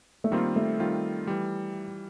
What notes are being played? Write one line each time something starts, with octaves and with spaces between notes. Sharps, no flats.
A3
D#3 G3 A#3 C4 F4
A3
D#3 G3 C4 F4
E3 G3